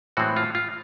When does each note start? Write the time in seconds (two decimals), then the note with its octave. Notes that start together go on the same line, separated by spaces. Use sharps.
0.17 A2 E3 G#3 C4 F#4
0.37 F4
0.55 F4